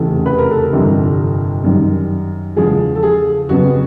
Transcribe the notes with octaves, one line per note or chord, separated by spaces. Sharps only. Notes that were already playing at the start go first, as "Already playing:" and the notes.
Already playing: F1 E2 C#3 E3 A3
B4
A#4
A4
A#4
G1 F2 C3 E3 G3
F#2 D#3 G3
E2 C#3 F3 G#3 G#4
A4
G#4
F2 C#3 F#3 B3 F#4